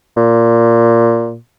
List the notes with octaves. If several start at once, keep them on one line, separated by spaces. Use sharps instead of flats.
A#2